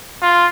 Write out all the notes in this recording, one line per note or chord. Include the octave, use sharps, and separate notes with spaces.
F4